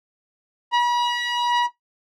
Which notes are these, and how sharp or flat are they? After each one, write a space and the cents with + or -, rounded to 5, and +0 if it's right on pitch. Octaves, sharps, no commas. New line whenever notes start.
B5 -40